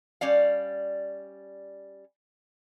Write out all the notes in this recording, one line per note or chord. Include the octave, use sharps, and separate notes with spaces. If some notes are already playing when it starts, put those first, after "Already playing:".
G3 C#4 D5 F5